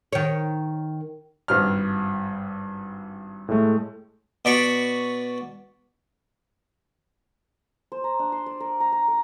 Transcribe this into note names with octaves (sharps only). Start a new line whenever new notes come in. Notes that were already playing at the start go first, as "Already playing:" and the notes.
D#3 C#5
G#1 G2 F6
A2 G#3 A3
B2 D5 B5 C#6
C5
A#5
D4
C6
D5
A#4
A#5
A#5
A#4